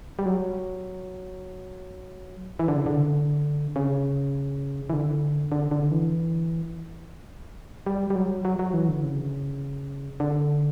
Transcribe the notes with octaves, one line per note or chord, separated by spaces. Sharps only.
G3
F#3
E3
D3
C#3
D3
C#3
E3
D3
D3
D3
E3
G3
G3
F#3
F#3
F#3
E3
D3
C#3
D3